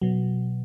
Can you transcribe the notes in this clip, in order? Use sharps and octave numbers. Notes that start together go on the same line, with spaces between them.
B2 F#3